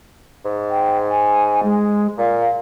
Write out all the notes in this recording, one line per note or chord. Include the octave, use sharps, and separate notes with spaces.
G#2
G5
G#5
G#3
A#2 F5